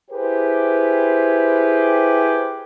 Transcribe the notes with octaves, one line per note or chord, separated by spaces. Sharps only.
E4 G4 G#4 B4 C5